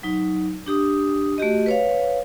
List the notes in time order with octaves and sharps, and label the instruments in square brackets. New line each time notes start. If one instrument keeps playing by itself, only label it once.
[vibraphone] F#3 D#4
D4 G4 D#6
A3 F#4 G4 D#5
B4 C#5 F5